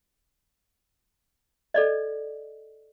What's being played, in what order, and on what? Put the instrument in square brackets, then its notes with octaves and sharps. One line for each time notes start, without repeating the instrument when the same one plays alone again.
[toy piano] A4 D5 D#5